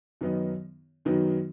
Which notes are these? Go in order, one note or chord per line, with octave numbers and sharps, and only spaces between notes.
F#2 D#3 F#3 B3 D#4
F#2 D#3 F#3 B3 D#4